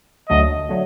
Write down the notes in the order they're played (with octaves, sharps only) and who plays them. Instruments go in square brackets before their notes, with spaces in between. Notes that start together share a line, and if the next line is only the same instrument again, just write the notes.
[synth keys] D2 D3 F#3 A3 [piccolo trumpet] D#5
[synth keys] D3 F#3 A3